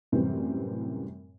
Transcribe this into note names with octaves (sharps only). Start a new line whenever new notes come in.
F#2 A2 C3 E3 G3 C4